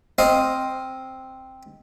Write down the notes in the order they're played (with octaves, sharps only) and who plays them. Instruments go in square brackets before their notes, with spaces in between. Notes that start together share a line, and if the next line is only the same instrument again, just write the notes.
[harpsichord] C4 C5 D#5 F5